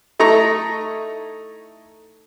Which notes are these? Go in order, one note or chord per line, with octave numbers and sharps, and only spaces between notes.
A3 D#4 E4 A#5 C#6